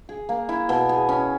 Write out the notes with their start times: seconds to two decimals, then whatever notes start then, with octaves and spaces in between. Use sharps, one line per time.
0.09 G#4
0.29 A#3
0.49 E4
0.69 B2
0.89 G#4
1.09 C#4